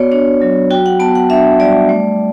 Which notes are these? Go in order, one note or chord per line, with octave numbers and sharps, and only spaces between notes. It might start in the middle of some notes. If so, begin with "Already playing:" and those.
Already playing: B3 F#4 C#5 D5
D4 C#5
F#3
F#4 G5
F#5
B3 A5
F#5
D4 E5
G3 D5
A3